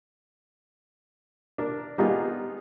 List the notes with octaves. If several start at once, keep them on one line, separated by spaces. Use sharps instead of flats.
D4 A#4
G3 A#3 B3 D#4 F4 G#4